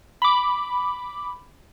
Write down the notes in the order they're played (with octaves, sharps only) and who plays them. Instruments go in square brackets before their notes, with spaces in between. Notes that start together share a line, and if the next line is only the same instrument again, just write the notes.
[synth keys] B5 D6